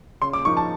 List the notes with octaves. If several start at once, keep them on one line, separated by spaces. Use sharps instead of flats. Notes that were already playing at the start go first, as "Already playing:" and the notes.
C#3 C6
D6
F3 A#3 D#4 C#6
A5